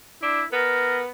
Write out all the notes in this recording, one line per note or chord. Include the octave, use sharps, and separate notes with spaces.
D4 E4
B3 A#4